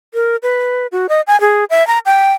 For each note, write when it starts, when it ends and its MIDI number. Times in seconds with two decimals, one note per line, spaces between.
0.14 0.36 70
0.43 0.87 71
0.92 1.07 66
1.09 1.21 75
1.27 1.39 80
1.41 1.65 68
1.70 1.86 76
1.87 1.99 82
2.06 2.32 79